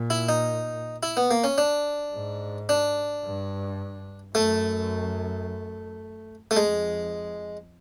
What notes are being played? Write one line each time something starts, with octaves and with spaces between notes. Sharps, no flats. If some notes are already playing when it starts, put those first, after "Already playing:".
Already playing: A#2
E4
D#4
E4
B3
A#3
C#4
D4
G#2
D4
G2
F#2 A3
A3
F2 G#3